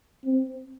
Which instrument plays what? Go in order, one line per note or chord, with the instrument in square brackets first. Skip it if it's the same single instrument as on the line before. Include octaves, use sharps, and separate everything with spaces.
[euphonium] C4